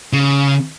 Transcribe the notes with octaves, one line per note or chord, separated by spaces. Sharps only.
C#3